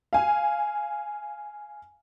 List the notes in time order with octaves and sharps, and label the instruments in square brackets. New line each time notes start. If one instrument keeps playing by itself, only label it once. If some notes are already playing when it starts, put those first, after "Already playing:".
[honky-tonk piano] F5 G#5